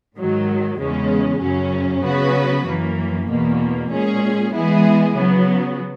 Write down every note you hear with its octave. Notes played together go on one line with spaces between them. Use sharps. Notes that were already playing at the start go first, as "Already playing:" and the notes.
G#2 D#3 F#3
E2 C#3 G#3 C#4
F#2 C#3 F#3 C#4
C#3 F#3 B3 F#4 B4
F#2 E3 A#3
E2 B2 A#3
A#2 G#3 C#4 G#4
E3 G#3 B3 E4 G#4
C#3 F#3 B3